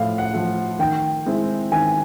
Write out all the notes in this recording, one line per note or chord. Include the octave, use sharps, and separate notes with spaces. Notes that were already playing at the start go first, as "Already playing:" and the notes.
Already playing: A2 F3 A3 F5
F#5
F3 A3
D#3 G5
G#3 C4 E4
D#3 G#5